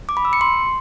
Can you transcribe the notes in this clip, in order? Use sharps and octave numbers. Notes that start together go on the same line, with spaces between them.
D6
B5
E6
C#7
C6